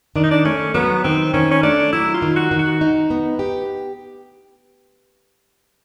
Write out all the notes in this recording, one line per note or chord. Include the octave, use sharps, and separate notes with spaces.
D#3 D4
D#4
D4
A3 C#4
F#3 B3
D#3 C4
D#3 C#4
C#4
A3 D4
F#3 E4
F4
D#3
F#4
D#3
F#4
D#4
B3
G4